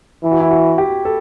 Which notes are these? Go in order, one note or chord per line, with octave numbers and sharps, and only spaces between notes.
E3 E4
F#4
E4
F#4
G4
A4